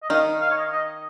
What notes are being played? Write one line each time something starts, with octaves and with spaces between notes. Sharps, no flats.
D#5
D#3 D#4 F5
F5
C#5
D#5
D#5